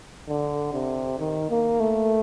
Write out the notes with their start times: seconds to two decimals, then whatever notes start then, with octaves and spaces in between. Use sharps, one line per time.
0.28 D3
0.73 C3
1.19 D#3
1.50 A#3
1.80 A3